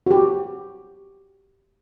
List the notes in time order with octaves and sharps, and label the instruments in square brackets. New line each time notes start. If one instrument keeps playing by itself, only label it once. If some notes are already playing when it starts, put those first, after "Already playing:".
[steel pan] F#4 G4